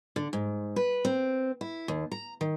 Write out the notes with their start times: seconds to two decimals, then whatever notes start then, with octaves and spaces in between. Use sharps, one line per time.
0.16 D3
0.33 G#2
0.76 B4
1.05 C4
1.61 E4
1.88 D#2
2.12 A#5
2.41 D#3